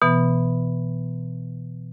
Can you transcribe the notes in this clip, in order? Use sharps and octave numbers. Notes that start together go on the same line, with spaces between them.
B2 E3 B3